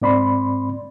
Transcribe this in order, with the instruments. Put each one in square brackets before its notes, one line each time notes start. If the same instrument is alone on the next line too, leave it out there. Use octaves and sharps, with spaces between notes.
[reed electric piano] G#2 C4 D5 B5 C6